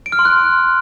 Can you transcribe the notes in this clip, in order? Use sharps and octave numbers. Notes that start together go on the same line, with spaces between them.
D7
F6
C6
F#6